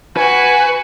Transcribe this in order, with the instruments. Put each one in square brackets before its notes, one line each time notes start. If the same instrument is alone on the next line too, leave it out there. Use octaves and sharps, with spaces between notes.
[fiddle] F#4 [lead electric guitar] B4 [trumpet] G#5